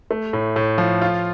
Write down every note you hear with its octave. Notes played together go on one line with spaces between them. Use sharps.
A3
A2
A2
F3
F4